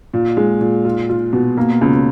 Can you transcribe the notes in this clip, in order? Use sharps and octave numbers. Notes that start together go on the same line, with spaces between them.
A#2
G#3
A#2
F4
F4
B2
A#3
C#2